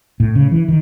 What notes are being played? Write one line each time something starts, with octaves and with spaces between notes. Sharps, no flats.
A2
C#3
E3
D#3